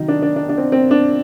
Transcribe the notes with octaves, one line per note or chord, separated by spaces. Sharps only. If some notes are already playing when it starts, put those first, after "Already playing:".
Already playing: C3 D#3 F#3 D#4
D4
D4
D4
D4
C4
C4
D4